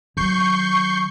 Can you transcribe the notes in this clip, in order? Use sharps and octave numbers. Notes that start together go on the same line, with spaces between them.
D#3 F#3 C#6 G6 C7